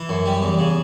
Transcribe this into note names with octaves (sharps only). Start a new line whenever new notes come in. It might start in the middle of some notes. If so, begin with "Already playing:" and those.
Already playing: E3
F#2
G3
E2
C#3